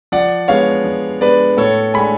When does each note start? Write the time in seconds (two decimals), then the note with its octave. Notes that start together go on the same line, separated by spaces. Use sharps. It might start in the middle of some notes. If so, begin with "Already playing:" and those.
0.12 F3 D5 F#5
0.48 G#3 B3 D4 C#5 F5
0.85 F3
1.21 G#3 B3 D4 B4 D5
1.57 A2 A4 C#5
1.94 G#3 D4 G#5 B5